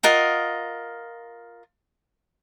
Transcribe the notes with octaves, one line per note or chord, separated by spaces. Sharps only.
F4 A#4 D#5 F#5